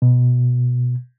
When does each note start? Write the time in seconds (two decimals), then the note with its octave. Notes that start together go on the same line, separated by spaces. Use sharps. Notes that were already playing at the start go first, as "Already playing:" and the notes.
0.02 B2